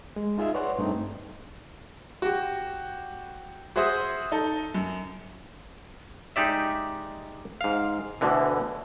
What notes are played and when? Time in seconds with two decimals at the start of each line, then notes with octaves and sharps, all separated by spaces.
0.16 G#3
0.38 D#4 F4 G#4 D#5 E5
0.54 B4 C#5 D5 F#5 C6
0.78 G2 A3 C4 D#4
2.22 F#4 G4
3.76 F#4 G#4 C5 E5 D#6
4.32 D#4 A4
4.74 F#2
6.36 G#3 D#4 G4 D5 E5
7.61 G#2 F5
8.21 D2 B2 D3 E3